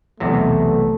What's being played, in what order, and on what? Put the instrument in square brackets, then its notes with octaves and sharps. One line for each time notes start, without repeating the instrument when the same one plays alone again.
[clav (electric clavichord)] B1 E2 C3 [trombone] A3